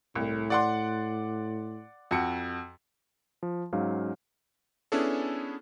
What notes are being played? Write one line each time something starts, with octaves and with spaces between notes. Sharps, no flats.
C2 A2
D5 F#5 C6
F2 F#4 C#7
F3
G#2 F#3 C#4 F5
B3 C#4 D4 E4 G#4 A4